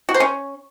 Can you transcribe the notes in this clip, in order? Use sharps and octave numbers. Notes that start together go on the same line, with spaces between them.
F#4
C5
C#4